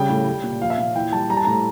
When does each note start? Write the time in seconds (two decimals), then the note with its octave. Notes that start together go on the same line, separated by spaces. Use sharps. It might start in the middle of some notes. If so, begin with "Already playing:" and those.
Already playing: C#3 G3 G5
0.09 A2
0.27 G3
0.44 A#2
0.61 F3 F5
0.70 E5
0.78 A#2 F5
0.95 E3 G5
1.12 G3 A5
1.29 G3 A#5
1.37 A5
1.44 A2 A#5